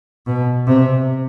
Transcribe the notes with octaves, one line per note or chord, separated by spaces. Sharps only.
B2
C3